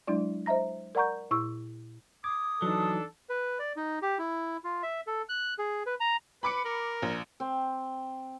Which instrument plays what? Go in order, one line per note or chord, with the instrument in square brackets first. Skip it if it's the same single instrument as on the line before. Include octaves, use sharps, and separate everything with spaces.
[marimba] F#3 G#3 D4 E4 D5
C5 D#5 E5 A#5 A#6
A#4 D5 F#5 A#5 C#6 G6
A#2 E4 C#6 E6
[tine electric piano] D6 G#6 [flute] D#6
[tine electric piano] E3 D#4 [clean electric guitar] F#3 [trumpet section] D4 A4
[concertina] B4
D5
D#4
G4
E4
F4
E5
A4
F#6
G#4
B4
A#5
[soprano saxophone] B4 [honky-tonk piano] B5 D6 C#7
[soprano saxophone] A#4
[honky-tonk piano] A#1
[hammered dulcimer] C4